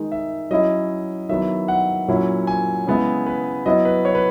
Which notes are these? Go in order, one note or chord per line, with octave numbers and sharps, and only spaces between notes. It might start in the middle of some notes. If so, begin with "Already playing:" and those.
Already playing: D#3 G#3 D#4
E5
F#3 C#4 E4 D#5
D#3 F#3 B3 E4 E5
F#5
A#2 F#3 C#4 E4
G#5
C#3 G#3 B3 E4
B4
F#3 B3 E4 D#5
B4
C#5
B4